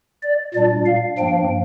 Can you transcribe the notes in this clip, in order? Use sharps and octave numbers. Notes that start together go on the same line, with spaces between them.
D5
A#2 G3 D4 D5
F5
G2 F3 A#3 D4 G5